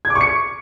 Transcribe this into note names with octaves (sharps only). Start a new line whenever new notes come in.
G#6
D6
C#6
C#7